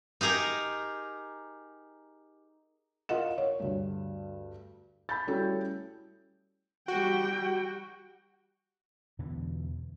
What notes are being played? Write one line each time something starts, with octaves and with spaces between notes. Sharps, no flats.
D#4 G4 G#4 A#4
F4 A#4 D#5 F#5 E7
C#5
D2 G2
B5 G6 A6
G3 A3 C#4 E4 F#4 A4
G3 F#4 G5
E2 B2 D3 E3